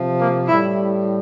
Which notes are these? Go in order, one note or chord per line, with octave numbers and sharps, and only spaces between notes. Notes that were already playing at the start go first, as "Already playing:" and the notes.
Already playing: C3 F3
A#3
A2 G3 E4